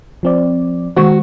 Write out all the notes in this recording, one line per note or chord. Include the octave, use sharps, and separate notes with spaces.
F3 C4 D5
D#3 G#3 F#4 C#6